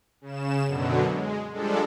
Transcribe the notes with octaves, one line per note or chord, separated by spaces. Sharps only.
C#3 E7
F#2 B2 D3 F#3
G#3
F3 G3 G#3 D4 A4